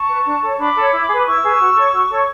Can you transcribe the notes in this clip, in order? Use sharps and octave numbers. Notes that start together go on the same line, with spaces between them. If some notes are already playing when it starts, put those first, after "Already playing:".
Already playing: A5 C#6
B4
D4
A4 C#5
D4 B5 D6
A4 C#5
E4
G#4 B4
D6
E4 C#6 E6
G#4 B4
F#4
A4 C#5
F#4
A4 C#5